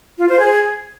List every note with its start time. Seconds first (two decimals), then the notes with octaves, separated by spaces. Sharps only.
0.18 F4
0.29 C5
0.40 G#4